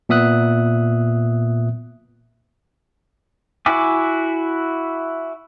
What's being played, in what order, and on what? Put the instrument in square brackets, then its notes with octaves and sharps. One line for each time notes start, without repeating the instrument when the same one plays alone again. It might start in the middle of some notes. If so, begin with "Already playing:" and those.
[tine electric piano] A#2 B3 E5 D#6 F#6
[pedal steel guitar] E4 F#4 E5 G#5 D6